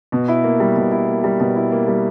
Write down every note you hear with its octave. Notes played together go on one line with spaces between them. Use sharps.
B2
E4
A#3
G3
B2
E4
A#3
G3
B2
E4
A#3
G3